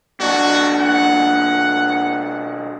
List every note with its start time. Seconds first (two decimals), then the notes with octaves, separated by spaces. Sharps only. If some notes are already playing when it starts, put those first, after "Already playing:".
0.20 B1 D4 F#4
0.80 F#5